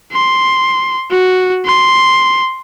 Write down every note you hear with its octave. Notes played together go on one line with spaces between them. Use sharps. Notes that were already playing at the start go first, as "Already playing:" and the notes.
C6
F#4
C6